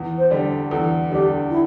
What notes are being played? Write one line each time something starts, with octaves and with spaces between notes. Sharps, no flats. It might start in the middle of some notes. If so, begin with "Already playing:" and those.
Already playing: E2
C5
D3 G3 D4
E2 A4
D3 G3 D4 G4
E4